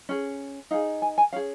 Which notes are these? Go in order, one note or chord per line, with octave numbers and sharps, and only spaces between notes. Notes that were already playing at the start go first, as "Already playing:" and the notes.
C#4 G#4
D#4 G#4 F5
G#5
G#5
C#4 G#4 F5